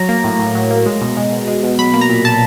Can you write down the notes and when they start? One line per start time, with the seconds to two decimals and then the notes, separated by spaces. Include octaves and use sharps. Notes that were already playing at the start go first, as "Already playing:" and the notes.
Already playing: F#3 A#5
0.09 A#3
0.24 A2
0.39 A2
0.55 F#3
0.71 A#3
0.86 G#3
1.01 B2
1.17 G#3
1.32 B2
1.48 G#3
1.63 B2
1.78 F#3 B5
1.94 A#3
2.01 A#5
2.09 A#2
2.24 A#2 A5